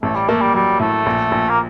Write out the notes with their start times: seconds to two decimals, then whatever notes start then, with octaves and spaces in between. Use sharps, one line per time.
0.03 A1 A3
0.15 G3
0.28 A3 A#3
0.41 G3
0.54 F#3 G3
0.80 A2 A3
1.06 A#1
1.32 A#1
1.49 A#3